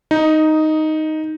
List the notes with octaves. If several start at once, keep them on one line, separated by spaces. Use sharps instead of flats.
D#4